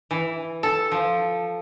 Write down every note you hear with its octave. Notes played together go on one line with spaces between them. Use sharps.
E3
A4
F3